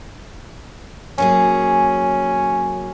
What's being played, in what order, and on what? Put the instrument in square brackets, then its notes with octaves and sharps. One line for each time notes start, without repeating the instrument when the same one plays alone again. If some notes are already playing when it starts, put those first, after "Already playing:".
[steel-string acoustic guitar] F#3 A#3 G#4 [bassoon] C#4